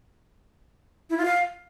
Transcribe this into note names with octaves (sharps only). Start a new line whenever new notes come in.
E4
F4
F5